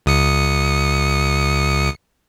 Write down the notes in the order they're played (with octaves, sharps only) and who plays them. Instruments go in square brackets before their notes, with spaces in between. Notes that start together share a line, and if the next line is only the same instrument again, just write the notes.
[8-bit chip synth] C#2 D#6 C#7